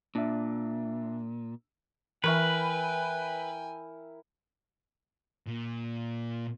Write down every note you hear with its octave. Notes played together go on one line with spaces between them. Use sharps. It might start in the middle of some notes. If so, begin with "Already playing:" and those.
A#2 D4 E5
E3 E4 A#4 B4 G5 G#5 C#6
A#2